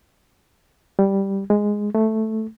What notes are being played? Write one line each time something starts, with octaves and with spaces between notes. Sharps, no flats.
G3
G#3
A3